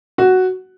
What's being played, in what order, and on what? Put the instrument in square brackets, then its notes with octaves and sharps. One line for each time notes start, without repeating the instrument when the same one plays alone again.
[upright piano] F#4